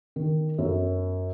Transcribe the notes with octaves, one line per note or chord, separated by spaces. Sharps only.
D#3
F#2